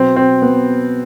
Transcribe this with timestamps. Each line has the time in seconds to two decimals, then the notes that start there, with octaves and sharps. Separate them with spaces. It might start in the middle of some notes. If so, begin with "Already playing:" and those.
Already playing: B2 F#3 C4
0.16 C4
0.42 B3